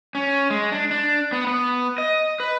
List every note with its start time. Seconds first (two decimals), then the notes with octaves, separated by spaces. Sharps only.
0.15 C#4
0.50 G#3
0.72 D4
0.91 D4
1.32 B3
1.47 B3
1.98 D#5
2.40 B4